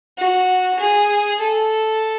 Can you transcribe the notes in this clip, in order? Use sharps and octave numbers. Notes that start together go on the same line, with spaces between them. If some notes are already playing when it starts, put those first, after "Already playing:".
F#4
G#4
A4